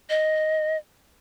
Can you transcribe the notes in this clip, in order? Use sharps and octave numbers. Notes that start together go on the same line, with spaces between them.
D#5